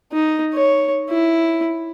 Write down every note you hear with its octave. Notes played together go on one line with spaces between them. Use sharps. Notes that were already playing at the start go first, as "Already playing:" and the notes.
D#4
C#5
E4